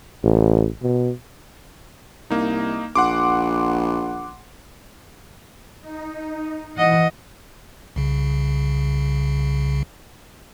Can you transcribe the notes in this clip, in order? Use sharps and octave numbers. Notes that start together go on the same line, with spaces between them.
A1
B2
C2 A#3 D#4
A#1 F#5 C6 D6
D#4
E3 D#5 F#5
C2 C#3